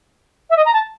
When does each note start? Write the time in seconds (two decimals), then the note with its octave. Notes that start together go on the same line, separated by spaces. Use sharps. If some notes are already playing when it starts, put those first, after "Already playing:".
0.50 E5
0.57 D#5
0.65 A#5
0.73 A5